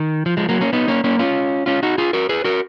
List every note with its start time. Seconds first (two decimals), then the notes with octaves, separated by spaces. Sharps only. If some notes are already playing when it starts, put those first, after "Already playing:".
Already playing: D#3
0.26 F3
0.37 F3 G#3
0.49 F#3 A#3
0.61 A#3 C#4
0.73 B3 D#4
0.88 A#3 C#4
1.04 A#3 C#4
1.19 C#4 F4
1.66 C#4 F4
1.83 D#4 F#4
1.98 F4 G#4
2.13 F#4 A#4
2.29 G#4 B4
2.44 F#4 A#4